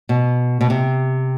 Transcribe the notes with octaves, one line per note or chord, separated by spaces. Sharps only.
B2
B2
C3